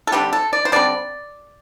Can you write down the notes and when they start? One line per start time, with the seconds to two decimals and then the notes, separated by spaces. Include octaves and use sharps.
0.07 A4
0.12 D3 G3 C4 G4
0.33 A4
0.53 D5
0.65 C5
0.72 D3 G3 C4 D5